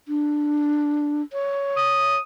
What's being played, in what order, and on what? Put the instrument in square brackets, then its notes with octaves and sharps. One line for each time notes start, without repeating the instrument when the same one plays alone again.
[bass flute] D4
C#5
[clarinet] D#6